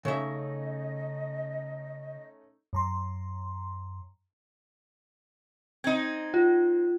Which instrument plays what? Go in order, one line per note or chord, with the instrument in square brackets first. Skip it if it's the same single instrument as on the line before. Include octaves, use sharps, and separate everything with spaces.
[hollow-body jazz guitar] C#3 E5 [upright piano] A3 C#4 D#4 [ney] D#5
[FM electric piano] F#2 A#5 C6
[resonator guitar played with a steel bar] C4 D#4 [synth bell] G#6
[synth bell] F4